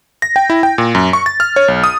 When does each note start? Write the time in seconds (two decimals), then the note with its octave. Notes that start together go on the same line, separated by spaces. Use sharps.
0.22 A#6
0.36 G5
0.50 E4
0.63 G5
0.78 A#2
0.95 F#2
1.13 C#6
1.26 A6
1.40 F6
1.56 C#5
1.68 B1
1.84 D#6